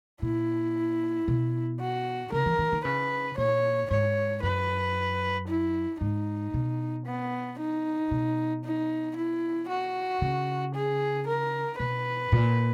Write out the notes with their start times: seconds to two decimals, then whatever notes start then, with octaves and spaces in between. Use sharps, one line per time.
0.22 A#2 E4
1.28 B2
1.80 F#4
2.32 C#3 A#4
2.46 E3
2.59 D#3
2.72 D#3
2.85 C#3 B4
3.38 A#2 C#5
3.91 G#2 C#5
4.43 F#2 B4
5.48 E4
6.01 G#2 D#4
6.54 B2
7.06 B3
7.59 D#4
8.11 B2
8.64 D#4
9.17 E4
9.69 F#4
10.22 C#3
10.75 G#4
11.27 A#4
11.79 B2 B4
12.32 A#2